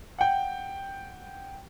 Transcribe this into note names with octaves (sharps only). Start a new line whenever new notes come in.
F#5 G5